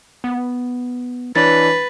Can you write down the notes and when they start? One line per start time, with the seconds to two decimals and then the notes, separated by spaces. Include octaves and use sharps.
0.24 B3
1.36 E3 D4 B4 C#5 A6